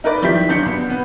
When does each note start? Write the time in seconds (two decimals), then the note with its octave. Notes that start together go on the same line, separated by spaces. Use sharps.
0.04 D#4 A#4 B4 D5
0.22 D#3 F3 E4 G4 G6 B6
0.49 G1 D#3 F#3 D4 G6 C#7
0.66 B2
0.90 B3